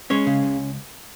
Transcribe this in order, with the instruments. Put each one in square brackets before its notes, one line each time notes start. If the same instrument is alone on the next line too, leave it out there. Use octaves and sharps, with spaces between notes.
[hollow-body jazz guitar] G#3 C#4 C#5
C#3
C#2